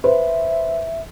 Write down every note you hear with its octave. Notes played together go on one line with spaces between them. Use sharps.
B4 C5 E5